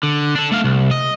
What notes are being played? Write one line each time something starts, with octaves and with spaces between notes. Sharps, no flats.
D3
D4 A4
A3 F5
C2
D#5